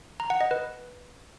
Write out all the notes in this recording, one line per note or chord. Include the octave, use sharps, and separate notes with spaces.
A#5
F#5
D#5
B4